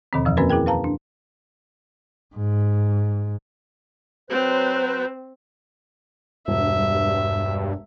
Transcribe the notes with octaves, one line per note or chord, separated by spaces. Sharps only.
D#2 B2 D3 D#3 F3 C4
F2 E3 F3
A#3 C4 C#4 F#4 A#4 B4
E4 G#4 A#4 G5
B4 F5 A5 A#5
D4
G#2
F#3 C4 B4 C5
E1 G2 E5